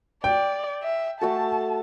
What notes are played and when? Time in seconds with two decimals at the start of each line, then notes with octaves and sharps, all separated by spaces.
0.24 D5 G5
0.83 E5
1.21 A3 F#4 A4 A5